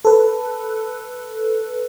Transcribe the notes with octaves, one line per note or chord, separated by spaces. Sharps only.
A4 B4